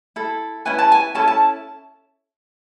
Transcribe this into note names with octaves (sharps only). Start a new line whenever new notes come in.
E4 A4
C#4 E4 B4 G#5
A5
G#5
C#4 E4 A4 A5
A5